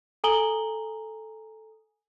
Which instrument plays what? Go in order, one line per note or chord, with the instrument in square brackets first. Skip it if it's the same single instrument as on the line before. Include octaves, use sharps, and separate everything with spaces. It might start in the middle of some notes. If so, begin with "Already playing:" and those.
[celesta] A4 G#5 A#5 D#6 F#7 G7